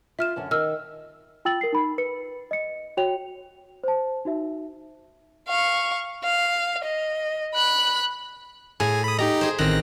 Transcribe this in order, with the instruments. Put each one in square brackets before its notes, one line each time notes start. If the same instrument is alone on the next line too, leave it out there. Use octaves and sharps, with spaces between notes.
[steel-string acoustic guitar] F4 [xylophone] E5 F6 E7
[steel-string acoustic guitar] F#2 D3 C#4
[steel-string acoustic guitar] D#3 [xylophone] D#5 E6 F6
[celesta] F4 G5 E6 A6 F#7
A#4 C7
D#4 B5
B4 C#7
D#5 C#7
F#4 C#5 G5 F7
C5 A5
D#4 F#4 E5
[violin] F5 C#6
F5
D#5
B5 F#6
[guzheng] A2 [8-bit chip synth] G#4 G#5
[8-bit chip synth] B5 D#6
[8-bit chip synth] D#4 G4 D#5 [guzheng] A#5
[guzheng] G#4 C5
[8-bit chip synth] A1 F#6 A#6 [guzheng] D#3 C4